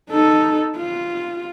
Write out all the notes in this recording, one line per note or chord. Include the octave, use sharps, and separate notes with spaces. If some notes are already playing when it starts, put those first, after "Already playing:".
D#4 A4
F4